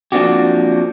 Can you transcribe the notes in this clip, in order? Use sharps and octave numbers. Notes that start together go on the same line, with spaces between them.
F3 A#3 C4 D4 F#4 G4